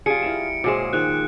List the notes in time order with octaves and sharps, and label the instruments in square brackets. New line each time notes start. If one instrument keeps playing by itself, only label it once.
[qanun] G3 [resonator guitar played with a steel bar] F4 G#4 [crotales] C#7 D7
[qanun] E4 A#4 E5
[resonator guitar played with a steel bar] A#2 G#4 C5 [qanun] F#3 G#3
[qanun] D#3 F3 G#3 [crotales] F#6